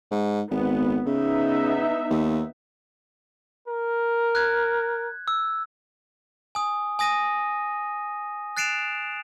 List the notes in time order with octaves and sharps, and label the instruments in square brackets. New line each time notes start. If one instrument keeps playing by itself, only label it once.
[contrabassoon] G#2
[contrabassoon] G#1 [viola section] B3
[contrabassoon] C#3 [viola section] B3 D#4 E5
[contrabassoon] D#2
[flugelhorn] A#4
[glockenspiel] F#6 G#6
E6
G#5 D#6
G#5 D#6 A#6 D#7
F#6 A6 C7 D7 E7 F7